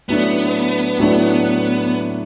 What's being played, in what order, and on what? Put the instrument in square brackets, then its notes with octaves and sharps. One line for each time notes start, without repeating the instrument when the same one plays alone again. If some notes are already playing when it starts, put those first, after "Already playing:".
[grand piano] A2 F#3 A3 D4 [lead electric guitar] B3
[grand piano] A2 F#3 A3 D4